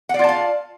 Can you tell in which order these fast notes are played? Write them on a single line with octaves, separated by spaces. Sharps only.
F#5 D5 F4 A5 F5